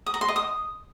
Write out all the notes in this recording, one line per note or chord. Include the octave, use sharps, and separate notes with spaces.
D#6
A#5
C6
D#5
D#6